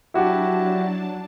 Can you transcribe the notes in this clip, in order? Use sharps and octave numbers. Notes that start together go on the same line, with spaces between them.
F#3 D4 E4 F#4 G4 A5